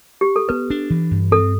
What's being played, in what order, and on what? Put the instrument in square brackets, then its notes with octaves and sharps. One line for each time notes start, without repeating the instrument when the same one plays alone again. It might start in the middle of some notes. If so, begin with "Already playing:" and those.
[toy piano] G4
A4
[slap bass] B3 [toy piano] B4
[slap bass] D4
E3
G2
[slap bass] C4 [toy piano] A4